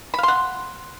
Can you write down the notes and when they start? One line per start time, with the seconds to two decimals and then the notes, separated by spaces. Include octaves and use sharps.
0.14 B5
0.18 F5
0.23 C6
0.28 F#5